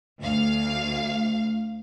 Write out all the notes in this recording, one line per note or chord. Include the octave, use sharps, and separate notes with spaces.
D2 F5